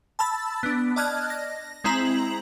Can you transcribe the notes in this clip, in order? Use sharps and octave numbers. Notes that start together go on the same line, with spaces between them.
A5 B5 E6 A6
B3 D4
D5 D#5 A5 F6 F#6 G#6
A#6
G#3 C4 E4 A#5 F#7